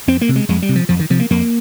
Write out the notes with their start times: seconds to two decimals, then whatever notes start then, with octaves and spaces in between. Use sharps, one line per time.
0.08 F2 C4
0.21 A#3
0.29 C3
0.36 G#3
0.48 F2 G#3
0.62 G3
0.69 C3
0.76 F3
0.89 F2 F3
0.99 D#3
1.10 C3 F3
1.20 A#3
1.30 F2 A#3